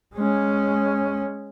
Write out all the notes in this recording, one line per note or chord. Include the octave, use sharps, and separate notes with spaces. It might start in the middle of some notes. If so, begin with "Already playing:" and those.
G#3 C#4